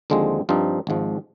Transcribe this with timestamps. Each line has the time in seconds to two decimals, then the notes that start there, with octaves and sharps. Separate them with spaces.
0.10 D#2 D3 F3 G#3 C4
0.49 G2 F3 C4 D#4
0.87 G#1 G#2 F3